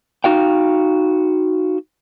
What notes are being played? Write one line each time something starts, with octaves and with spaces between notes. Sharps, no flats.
D#4 F#4 F5 G5